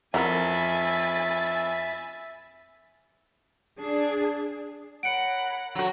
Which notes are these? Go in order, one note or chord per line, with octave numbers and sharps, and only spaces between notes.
F2 E3 C#4 A#4 E5 G#5 B5 A6
D4 G#4
A#4 C#5 F#5 B5 C#7 D7
F#3 F#4 A4 A#4 A#5